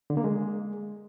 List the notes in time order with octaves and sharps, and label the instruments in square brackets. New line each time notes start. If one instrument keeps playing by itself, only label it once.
[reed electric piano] D3
A#3
G#3